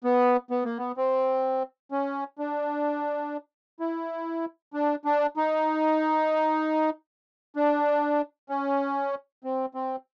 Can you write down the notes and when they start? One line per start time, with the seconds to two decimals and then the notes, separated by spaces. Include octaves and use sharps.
0.04 B3
0.50 B3
0.64 A#3
0.78 B3
0.97 C4
1.91 C#4
2.38 D4
3.80 E4
4.73 D4
5.05 D4
5.37 D#4
7.56 D4
8.49 C#4
9.44 C4
9.74 C4